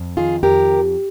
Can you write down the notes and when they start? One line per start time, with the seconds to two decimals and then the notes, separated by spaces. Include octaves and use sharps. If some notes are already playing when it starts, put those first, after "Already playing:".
Already playing: F2
0.17 D#3 F4 G#4
0.43 F2 G4 A#4